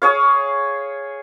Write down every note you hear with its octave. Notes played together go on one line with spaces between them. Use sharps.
G#4 C#5 F5